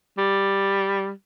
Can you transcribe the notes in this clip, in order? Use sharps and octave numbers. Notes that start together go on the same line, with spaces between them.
G3